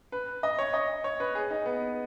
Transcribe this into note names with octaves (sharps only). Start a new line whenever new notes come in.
B4
D#5
C#5
D#5
C#5
B4
G#4
D#4
B3